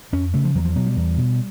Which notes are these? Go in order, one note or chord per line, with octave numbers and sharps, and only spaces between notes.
F2 C#4
C#3 A3
F3
E2 F#3
F3
B2 F#3
G3
E2
B2